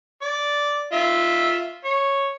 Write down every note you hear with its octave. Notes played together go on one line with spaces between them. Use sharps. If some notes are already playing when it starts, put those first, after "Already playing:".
D5
F4 E5
C#5